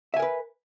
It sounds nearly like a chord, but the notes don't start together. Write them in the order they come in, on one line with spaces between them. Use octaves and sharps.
E5 G#5 A#4 B4